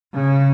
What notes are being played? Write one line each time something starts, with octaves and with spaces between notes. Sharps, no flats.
C#3